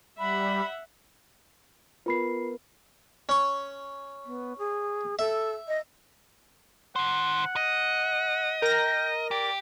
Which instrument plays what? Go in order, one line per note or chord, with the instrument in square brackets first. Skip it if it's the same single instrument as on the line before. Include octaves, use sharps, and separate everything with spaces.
[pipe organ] G3 [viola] E5 F#5 [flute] B5
[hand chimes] B3 A#4 B4 [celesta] F4 B5 C7
[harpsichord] C#4 C#6
[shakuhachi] B3
G#4
[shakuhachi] A4 [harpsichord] E5
[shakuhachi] D#5
[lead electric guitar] D#3 C5 [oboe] F#5
[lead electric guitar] D#5
[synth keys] A#4 A#6 [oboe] G5
[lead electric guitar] G4 [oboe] D5